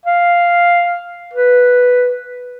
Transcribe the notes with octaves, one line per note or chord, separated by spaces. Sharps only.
F5
B4